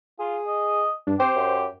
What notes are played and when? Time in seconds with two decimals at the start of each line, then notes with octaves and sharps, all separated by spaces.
0.19 F4 G#4
0.47 D#5
1.07 G2 D4
1.20 C4 G4 C5
1.36 F#2